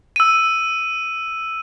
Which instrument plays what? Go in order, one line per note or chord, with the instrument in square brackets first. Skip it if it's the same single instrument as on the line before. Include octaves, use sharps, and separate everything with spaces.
[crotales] E6 D#7